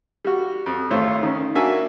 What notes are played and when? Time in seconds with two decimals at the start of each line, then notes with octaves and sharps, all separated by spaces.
0.25 G3 F#4
0.66 F2
0.91 G#1 A3 F4 C5 C#5
1.23 D#3 C#4
1.55 A#3 D4 F#4 E5 G#5